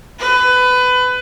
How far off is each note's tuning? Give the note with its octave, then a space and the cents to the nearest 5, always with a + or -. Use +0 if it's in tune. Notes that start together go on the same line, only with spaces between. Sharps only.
B4 +20